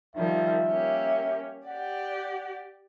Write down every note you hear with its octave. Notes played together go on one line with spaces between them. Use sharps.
D#3 F3 G3 E5
A#3 C#4 G4
G4 D5 F#5